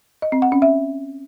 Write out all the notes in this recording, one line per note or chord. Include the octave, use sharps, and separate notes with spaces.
D#5
C4
F#5
C#4
E5